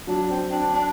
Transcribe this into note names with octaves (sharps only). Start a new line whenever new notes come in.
F#3 D4
C4
D4
D4